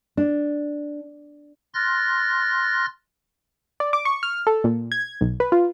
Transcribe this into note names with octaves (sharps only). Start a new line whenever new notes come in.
D4
C6 F6 F#6 A6 A#6
D5
D6
C#6
F6
A4
A#2
G#6
B1
B4
F4